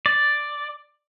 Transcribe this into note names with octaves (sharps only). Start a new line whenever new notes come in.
D5